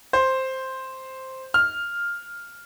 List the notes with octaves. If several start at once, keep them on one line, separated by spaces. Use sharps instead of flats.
C5
F6